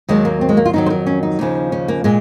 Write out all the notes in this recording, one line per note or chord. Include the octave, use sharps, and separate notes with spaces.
D#2 D#3 F#3 G#3
A#3
C4
G#3
A#3
F4
F2 D#3 F#3 D#4
C5
A#4
C#4
D#4
D#2 C#3 F3
C#4
A#3
A#2 G#3